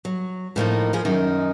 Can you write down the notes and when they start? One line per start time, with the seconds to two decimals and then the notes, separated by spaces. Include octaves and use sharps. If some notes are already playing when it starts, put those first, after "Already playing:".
0.05 F#3
0.56 A2 F3 A#3 D#4
0.93 F3 G#4
1.05 F#2 D#3 D#4